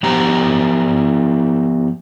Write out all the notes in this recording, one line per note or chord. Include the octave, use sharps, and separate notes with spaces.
F3 B3 G4 C5 A#5